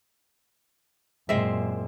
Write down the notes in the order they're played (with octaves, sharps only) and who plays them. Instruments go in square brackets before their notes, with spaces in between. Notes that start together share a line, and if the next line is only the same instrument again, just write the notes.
[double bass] F#2 A#2 [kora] G#3 C4 E5